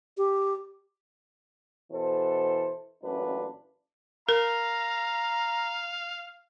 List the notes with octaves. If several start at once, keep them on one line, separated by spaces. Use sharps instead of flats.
G4
B2 E3 A4 C5
A1 F#2 A#2 D4 B4
A#4 F5 A#5